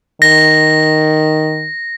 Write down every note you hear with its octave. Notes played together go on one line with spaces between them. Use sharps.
D#3 A#6